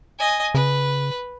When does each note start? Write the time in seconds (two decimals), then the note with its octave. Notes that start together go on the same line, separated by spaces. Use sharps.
0.19 D#5 G#5
0.54 C#3 B4